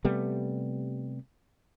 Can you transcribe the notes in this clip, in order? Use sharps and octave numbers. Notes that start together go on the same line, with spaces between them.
C3 G3 A3 B3